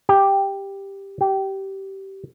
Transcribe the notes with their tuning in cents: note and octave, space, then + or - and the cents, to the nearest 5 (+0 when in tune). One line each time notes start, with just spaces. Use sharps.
G4 +5
G4 -20